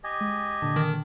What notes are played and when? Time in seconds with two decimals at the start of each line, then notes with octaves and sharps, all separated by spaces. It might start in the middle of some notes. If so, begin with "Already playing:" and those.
0.04 G4 D#5 G#5
0.21 G#3
0.62 A#2 D3 A5
0.76 D#3